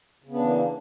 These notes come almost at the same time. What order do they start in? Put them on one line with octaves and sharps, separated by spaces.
C#3 B3 D4 E3 A#3